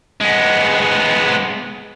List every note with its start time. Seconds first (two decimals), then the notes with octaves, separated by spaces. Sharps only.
0.21 G#3 B3